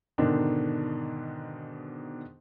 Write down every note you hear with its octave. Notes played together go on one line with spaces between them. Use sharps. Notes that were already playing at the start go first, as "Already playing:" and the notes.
G#2 B2 D3 D#3 D4